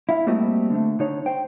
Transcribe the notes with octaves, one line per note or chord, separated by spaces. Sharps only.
E4 F5
G3 A3 A#3 C4 F#4 D#5
D3 A3
D3 D#4 C#5
C5 G5